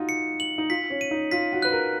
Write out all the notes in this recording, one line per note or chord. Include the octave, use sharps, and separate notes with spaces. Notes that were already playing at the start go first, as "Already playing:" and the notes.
Already playing: D#4 F4 F#4
C#7
F#7
D#4
F4 B6
C#4
D#7
D#4
F4 B6
F#4
B4 F#6
A#4